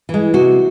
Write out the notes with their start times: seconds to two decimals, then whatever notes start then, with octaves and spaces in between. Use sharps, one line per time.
0.09 E3 G#3
0.34 C3 F#4